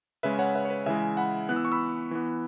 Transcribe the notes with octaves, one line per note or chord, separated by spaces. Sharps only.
C#3 G#3 C#4 B4 E5
C#5 F#5
B4 E5
C#5
B4
C#3 E3 G#3 E5 G#5
F#5 B5
E3 B3 F#6
E6
C#6
B5 E6
E3 B3